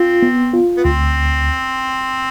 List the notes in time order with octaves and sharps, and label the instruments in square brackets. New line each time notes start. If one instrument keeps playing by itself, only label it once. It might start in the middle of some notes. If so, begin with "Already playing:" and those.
Already playing: [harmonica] C4 [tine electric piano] F4
[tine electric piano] B3
F4
[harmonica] B3
[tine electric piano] D2 [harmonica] C4